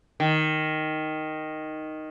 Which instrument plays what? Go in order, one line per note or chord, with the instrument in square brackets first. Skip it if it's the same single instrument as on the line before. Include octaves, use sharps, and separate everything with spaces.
[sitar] D#3